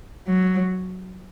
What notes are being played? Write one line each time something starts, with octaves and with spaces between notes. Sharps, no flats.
F#3